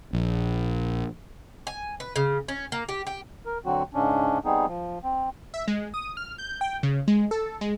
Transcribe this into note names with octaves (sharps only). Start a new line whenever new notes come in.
A#1
G#5
B4
C#3
C#4
A#3
G4
G4
A#4
D3 F#3 C4 F#4
G#2 C#3 C#4 D4
G3 B3 C4 D#4 G#4
F3
C4
E5
G#3
D#6
F6
G6
G5
C#3
G#3
A4
G#3